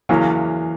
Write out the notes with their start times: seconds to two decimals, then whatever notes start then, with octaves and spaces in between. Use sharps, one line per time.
0.09 E2 C#3 E3 F#3 A#3